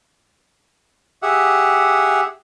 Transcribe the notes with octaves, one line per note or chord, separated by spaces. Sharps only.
G4 G#4 E5 F#5